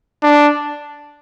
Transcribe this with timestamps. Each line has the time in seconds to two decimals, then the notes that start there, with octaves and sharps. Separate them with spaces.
0.23 D4